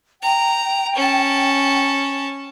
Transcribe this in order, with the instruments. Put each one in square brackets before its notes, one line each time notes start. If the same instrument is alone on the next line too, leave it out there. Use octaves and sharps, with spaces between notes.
[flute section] G5 [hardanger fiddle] A#5
[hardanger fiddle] C#4 A5